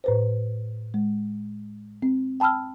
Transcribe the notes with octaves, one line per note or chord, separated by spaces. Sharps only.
A2 B4 C5
G#3
C4
G5 A5 B5 E6 F6